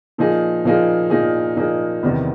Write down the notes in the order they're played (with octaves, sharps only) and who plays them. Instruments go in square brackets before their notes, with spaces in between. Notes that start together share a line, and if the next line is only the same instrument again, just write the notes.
[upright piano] A#2 F3 A#3 D#4 G#4
A#2 F3 A#3 D#4 G#4
A#2 F3 A#3 D#4 G#4
A#2 F3 A#3 D#4 G#4
E2 C3 D#3 G3 B3